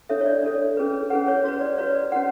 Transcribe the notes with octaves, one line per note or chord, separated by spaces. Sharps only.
D4 A4 C#5 E5
C#5
D5
D4 A4 C#5
C#4 G#4 B4
C#4 G#4 B4 F#5
C#5
F#4 B4 C#5
D5
F#4 B4 C#5
D5
C#4 F#4 B4 F#5